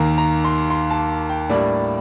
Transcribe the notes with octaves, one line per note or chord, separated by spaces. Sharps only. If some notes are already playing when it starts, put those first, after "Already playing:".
Already playing: D#2 D#3 A#3 A#5
A#5
C6
C6
A5
G5
A2 G3 A#3 D4 D5